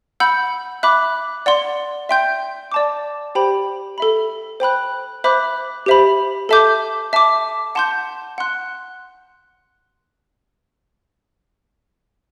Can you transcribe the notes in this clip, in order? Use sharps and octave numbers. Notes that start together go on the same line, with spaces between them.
F#5 B5 E6 G6
E5 B5 D6 F#6
D5 F#5 C6
E5 G5 C6 G6
D5 A5 D6
G4 C5 G5 B5
A4 E5 B5
C5 G5 B5 F#6
C5 E5 B5 D6 F#6
G4 C5 E5 B5
A4 E5 A5 D6 G6
E5 A5 D6
F#5 A5 C6 G6
F#5 C6 F#6